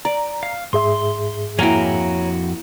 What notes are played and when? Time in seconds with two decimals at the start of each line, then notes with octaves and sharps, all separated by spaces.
0.05 D5 A#5
0.43 F5
0.73 G#2 G#4 E5 C6
1.59 F2 A#3 E4 F#4 C#5 G5 G#5 A#5